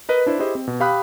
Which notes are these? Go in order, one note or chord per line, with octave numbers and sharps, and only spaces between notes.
A#4 B4 D#5
D4 E4 C5
E4 G4 G#4 C5 D#5
C4
B2
G4 F5 G5 B5 D#6 F#6